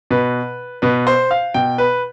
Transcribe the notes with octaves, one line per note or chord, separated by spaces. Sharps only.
B2 B4
B2 B4
C5
F5
B2 G5
B4